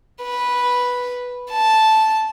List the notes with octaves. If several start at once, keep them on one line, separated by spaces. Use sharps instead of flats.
B4
A5